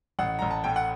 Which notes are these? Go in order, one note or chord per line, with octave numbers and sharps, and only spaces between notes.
A1 F#5
A1 A#5
A5
A2 G5
F#5